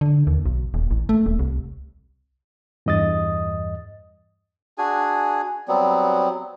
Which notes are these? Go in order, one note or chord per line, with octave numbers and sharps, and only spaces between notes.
D3
D#2
B1
D#1
A1
A3
D#1
C2
E2 G2 D#5 D#6 A6
D4 F#4 G#4 G#5
F#3 G3 B3 C4